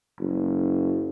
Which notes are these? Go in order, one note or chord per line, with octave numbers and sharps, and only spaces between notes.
F#1